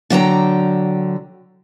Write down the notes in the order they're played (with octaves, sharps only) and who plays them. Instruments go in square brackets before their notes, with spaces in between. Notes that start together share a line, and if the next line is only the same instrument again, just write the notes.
[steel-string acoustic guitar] D3 F#3 G5 A#5